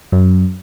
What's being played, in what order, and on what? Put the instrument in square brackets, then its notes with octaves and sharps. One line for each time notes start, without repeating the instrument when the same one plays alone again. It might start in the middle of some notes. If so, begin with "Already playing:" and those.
[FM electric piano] F#2